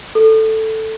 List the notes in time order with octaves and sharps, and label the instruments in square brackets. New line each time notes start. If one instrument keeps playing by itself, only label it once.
[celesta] A4